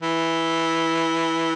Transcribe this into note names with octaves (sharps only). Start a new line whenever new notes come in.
E3